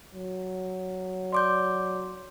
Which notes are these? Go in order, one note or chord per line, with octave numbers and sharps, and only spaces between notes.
F#3
D5 C6 D6 G6